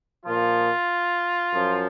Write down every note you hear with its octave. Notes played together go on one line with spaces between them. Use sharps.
A#2 F3 F4
F#2 F3